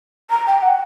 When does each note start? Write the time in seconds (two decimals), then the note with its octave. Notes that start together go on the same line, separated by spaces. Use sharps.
0.30 A#5
0.47 G5
0.62 F#5